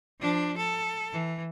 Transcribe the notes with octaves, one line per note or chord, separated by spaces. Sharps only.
F3 D4
A4
E3